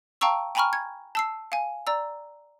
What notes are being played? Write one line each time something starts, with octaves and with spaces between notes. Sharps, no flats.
F5 G5 A5 A#5 C#6 E6
G5 G#5 A#5 B5 C#6 F6
G#6
A5 E6 C7
F5 G#5
D5 A#5 E6